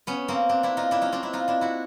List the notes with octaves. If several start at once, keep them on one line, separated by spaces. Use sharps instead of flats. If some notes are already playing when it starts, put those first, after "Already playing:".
B3 C#4
A#3 C4
C4 D4
D4 E4
D#4 F4
D4 E4
C#4 D#4
C4 D4
D4 E4
D#4 F4
D4 E4
E4 F#4